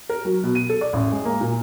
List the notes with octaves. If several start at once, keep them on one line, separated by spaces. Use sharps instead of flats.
A#4
F#3
B2
D#7
A4
D5
A1
G#3
A#3
A#2